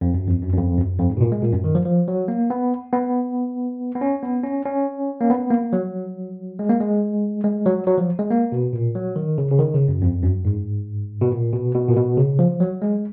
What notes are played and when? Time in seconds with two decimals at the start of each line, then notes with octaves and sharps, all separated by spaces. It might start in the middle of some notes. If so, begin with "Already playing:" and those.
0.01 F2
0.14 F#2
0.28 F2
0.42 F#2
0.53 F#2
0.57 F2
0.78 F#2
0.99 F2
1.10 G#2
1.17 B2
1.21 A#2
1.32 G#3
1.42 A#2
1.53 F#2
1.64 D#3
1.75 F3
1.85 F3
2.08 F#3
2.28 A#3
2.50 B3
2.93 B3
3.95 B3
4.01 C#4
4.23 B3
4.44 C#4
4.65 C#4
5.21 A#3
5.30 B3
5.51 A#3
5.73 F#3
6.59 G#3
6.69 A#3
6.80 G#3
7.44 G#3
7.66 F#3
7.87 F#3
7.98 F3
8.19 G#3
8.30 A#3
8.52 B2
8.73 A#2
8.95 F#3
9.16 D#3
9.38 C#3
9.51 C#3
9.59 D#3
9.74 C#3
9.88 F#2
10.02 F2
10.23 F#2
10.45 G#2
11.21 B2
11.32 A#2
11.53 B2
11.75 B2
11.89 A#2
11.96 B2
12.17 C#3
12.39 F3
12.60 F#3
12.82 G#3